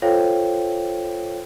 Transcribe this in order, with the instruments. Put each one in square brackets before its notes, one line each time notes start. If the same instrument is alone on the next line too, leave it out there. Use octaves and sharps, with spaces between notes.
[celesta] F4 A4 C5 C#5 F5 G5